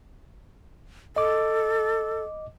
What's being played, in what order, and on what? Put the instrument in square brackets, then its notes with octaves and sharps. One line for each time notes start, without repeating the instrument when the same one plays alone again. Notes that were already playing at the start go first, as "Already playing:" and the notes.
[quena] A4 [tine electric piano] D#5 D6